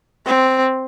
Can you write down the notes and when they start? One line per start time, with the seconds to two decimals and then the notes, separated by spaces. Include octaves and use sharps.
0.26 C4